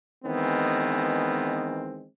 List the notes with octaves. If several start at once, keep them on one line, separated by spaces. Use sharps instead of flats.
D#3 E3 G#3 B3 C4